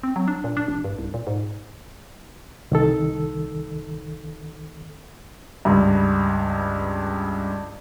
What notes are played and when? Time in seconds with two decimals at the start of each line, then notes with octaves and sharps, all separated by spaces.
0.03 C4
0.16 F#3
0.28 D4
0.44 A#2
0.57 D4
0.68 A1
0.84 G2
0.98 C2
1.14 A#2
1.27 G#2
2.72 C2 D#3 A4
5.65 C#2 G2